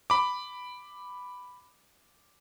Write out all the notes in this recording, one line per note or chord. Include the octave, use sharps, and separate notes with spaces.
B5 D6